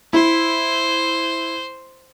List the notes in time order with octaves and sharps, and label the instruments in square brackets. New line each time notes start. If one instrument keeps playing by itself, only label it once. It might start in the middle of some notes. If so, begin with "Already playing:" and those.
[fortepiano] E4 [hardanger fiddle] C5